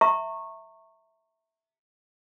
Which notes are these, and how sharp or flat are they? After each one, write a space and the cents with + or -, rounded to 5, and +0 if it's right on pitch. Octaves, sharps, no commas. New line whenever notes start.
E5 -5 A#5 -35 C#6 -20